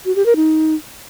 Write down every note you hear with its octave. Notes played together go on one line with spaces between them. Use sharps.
F#4
G4
A#4
D#4